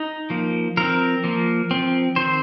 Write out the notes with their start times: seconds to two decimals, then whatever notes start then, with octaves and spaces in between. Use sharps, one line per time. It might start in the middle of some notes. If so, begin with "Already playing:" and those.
Already playing: D#4
0.30 F3 A#3
0.77 F3 C4 A#4
1.24 F3 A#3
1.71 F3 C4
2.16 D#3 C4 C5